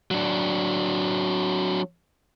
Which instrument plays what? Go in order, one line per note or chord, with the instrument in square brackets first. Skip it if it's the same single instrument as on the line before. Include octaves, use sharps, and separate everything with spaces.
[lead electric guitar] F#3 D4